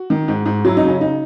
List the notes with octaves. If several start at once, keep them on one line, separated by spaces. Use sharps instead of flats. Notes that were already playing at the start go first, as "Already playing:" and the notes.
Already playing: F#4
D#3
G#2
G#2
F#3 E4
D#4
C#3
C#4
D#4